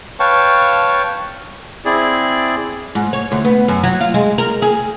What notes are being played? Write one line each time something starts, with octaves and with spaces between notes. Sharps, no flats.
B4 C#5 F5 G5 A5 C#6
C4 E4 G#4 D5
G#2
C#5
D2
B3
F#2
F#3
F4
G#3
A#4
G#4